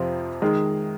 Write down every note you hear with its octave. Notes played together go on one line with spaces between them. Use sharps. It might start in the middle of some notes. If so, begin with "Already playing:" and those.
Already playing: F2 C3 F3 C4 F4
D#3 G#3 D#4 G#4